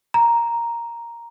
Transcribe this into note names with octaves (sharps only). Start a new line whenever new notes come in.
A#5